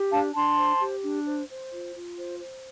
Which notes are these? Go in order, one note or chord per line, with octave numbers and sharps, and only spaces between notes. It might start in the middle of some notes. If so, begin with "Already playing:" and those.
Already playing: G4
D4 F5 A5
D4 A5 C6
C5
G4
D4
C5
C5
F4
F4
C5
C5